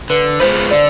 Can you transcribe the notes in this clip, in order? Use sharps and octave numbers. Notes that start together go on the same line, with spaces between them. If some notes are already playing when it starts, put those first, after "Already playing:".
D3 B4
G#3 B3 F4 B4 C5
D3 D5